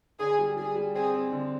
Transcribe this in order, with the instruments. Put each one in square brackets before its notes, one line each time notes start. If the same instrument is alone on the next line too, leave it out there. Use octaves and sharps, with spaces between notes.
[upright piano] D3 [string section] G#4
[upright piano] G3
[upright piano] G3 [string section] G#4
[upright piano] G3
[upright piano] C4 [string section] G#4
[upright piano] C4
D3